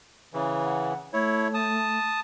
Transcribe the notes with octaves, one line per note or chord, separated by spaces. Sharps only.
C#3 E3
F#5
A3 E4 C#5
A5 D#6